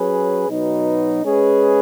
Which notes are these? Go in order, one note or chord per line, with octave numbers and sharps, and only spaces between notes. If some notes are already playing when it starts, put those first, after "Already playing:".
Already playing: F#3 C#4 G#4 B4
B2 F#3 D#4 B4
G#3 C#4 G#4 B4